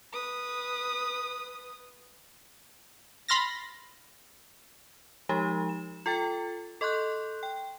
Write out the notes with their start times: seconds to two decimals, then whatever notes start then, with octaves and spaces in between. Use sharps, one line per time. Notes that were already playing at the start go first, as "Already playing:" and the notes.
0.12 B4 D#6
3.28 B5 C6 F6 A6 A#6
5.29 F3 G#3 D#4 G4
5.69 E7
6.06 F4 A4 G5 A6 C#7
6.81 A4 D#5 C6 C#6 F#6 G6
7.43 G5